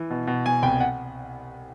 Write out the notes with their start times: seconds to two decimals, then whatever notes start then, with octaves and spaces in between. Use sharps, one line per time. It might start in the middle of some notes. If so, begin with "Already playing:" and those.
Already playing: E3
0.10 B2
0.27 B2
0.46 B2 G#5
0.63 C2 G5
0.80 F#5